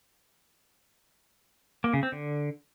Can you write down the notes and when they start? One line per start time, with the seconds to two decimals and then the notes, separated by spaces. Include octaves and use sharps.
1.84 A#3
1.93 C#3
2.03 C4
2.12 D3